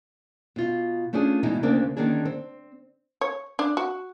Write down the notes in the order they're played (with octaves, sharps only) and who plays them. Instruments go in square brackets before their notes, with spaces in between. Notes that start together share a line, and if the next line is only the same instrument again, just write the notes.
[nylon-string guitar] B2 F4
A3 C#4 D4 F4 G#4
B2 E3 G#3 D#4 E4
D2 C#3 A#3 C4 D4
D3 D#3 A#3 C#4 D4 G#4
C4
[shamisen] C#5
D4
F#4